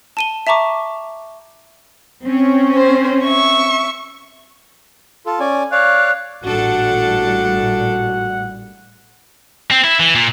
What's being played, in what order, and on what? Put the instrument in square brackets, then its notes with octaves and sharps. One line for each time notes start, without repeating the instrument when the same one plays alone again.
[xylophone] A5 D#7 G7
E5 A5 A#5 C#6 D6
[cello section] C4 C#4
[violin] C5
E5 C#6
[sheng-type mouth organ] F4 A4
C#4 D5 G#5
[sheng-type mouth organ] C#5 D5 F5 [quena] F#6
[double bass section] A1 A#2 G3 [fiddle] D4 A4 [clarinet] F#4 [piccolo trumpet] F#5
[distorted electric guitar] C4
E4
E3
A#2